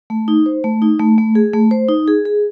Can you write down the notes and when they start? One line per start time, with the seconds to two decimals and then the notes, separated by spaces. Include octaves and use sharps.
0.10 A3
0.28 D#4
0.46 C5
0.64 A3
0.82 D#4
0.99 A3
1.18 A3
1.35 G#4
1.53 A3
1.71 C5
1.89 D#4
2.08 G#4
2.25 G#4